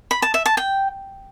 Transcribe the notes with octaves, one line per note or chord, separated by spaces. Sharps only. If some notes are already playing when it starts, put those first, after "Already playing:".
B5
A5
E5
A5
G5